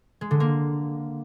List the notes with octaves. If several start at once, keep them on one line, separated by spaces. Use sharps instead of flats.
G#3
D3
A#3